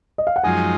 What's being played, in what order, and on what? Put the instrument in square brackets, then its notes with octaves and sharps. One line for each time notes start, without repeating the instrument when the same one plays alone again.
[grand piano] D#5
F5
F#5
[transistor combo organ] F#2 F3 G#3 D#4 [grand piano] G#5